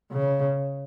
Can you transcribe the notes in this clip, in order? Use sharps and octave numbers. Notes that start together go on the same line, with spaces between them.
C#3